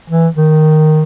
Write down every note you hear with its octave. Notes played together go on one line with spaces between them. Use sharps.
E3
D#3